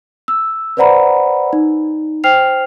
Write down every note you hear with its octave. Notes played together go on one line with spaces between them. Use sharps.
E6
B4 C5 D5 F#5 A#5 B5
D#4
C5 G5 F6 C7 F7